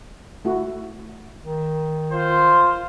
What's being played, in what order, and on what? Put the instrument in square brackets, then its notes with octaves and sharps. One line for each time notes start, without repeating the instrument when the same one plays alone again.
[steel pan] A3 E4 F#4
[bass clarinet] D#3
[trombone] F4 [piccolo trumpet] C5